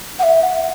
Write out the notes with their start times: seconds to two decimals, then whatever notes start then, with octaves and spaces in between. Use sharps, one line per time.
0.19 F#5
0.23 E5
0.43 F#5